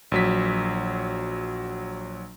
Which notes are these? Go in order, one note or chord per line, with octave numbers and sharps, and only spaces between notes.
A#1 F#3 B6